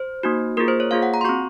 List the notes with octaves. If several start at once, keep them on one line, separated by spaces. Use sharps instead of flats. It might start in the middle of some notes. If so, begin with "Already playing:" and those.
Already playing: C5
A#3 D#4 F#4
A#3 F4 G#4 A#4
C5
C#5
A#3 F4 G#4 F5
F#5
A#5
C6
C4 F#4 C#6